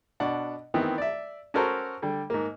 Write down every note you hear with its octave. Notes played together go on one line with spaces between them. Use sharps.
B2 D4 F#5
D#3 E3 B3 C4
D5 E5
C#4 F#4 A4 A#4 C5
D3 G3
G#2 A#3